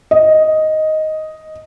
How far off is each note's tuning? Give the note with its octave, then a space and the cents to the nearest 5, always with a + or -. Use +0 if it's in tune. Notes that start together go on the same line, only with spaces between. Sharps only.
D#5 +5